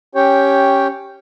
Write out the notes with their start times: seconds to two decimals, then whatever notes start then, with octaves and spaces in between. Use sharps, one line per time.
0.15 C#4 G4 C#5 G5